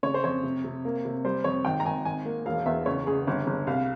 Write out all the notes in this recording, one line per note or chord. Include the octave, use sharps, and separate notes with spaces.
C#3 C#5
C5
F2 C#5
C3
C3
A#3
C3
G3 C5
F2 C#5
G#1 G5
A#5
G#1 G#5
G#1 G#5
A#3
E1 F5
E2 E5
C#2 C#5
C#2 G#4
G1
G1
C2 F5